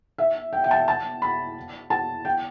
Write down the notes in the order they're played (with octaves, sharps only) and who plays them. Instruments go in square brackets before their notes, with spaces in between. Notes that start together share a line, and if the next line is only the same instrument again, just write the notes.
[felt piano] E5
G5
G5
A5
A5
B5
A5
G5